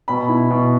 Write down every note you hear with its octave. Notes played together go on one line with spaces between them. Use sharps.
B2 B5
E4
B2